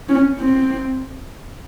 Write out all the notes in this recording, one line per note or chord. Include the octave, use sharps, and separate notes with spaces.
C#4
C4